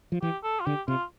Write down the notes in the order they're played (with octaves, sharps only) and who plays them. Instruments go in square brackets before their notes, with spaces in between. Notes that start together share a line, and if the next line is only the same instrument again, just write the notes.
[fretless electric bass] F3
[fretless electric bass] E3 [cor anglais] G4
[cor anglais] A4
F4
[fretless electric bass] D3 [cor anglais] G4
[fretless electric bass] C3 [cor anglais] F4